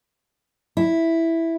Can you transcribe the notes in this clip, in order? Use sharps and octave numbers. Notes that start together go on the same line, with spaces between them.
E4